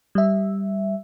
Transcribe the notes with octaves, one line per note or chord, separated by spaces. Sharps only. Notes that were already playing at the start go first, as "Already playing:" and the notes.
G3 E5